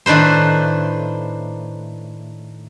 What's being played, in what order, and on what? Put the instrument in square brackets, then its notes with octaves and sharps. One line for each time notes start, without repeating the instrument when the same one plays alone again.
[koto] A2 D#3 D4 B4 C5